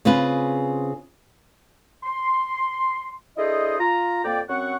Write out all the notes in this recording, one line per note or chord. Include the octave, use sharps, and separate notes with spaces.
C#3 C4 F4 G#4 B4
C6
D4 E4 G#4 A4 C5 D#5
F4 A#5
F2 A#3 D5 G5
F#2 C4 F#5 C#6